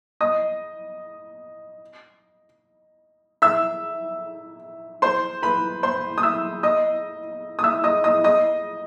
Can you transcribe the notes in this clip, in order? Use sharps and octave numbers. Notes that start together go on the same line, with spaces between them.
D#5 D#6
E5 E6
C5 C6
B4 B5
C5 C6
D#6
E5 E6
D#5 D#6
D#6
E5 E6
D#5 D#6
D#5 D#6
D#5 D#6